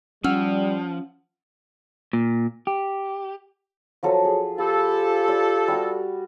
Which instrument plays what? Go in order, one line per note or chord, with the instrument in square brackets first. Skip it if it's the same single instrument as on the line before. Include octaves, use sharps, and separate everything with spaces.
[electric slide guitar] F3 [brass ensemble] G3 [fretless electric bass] C#4 [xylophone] F#5 E6 F6
[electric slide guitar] A#2
G4
[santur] F3 F#3 A4
G#4
[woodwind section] F4 G4 A4 [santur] B5
[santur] D5
G3 F#4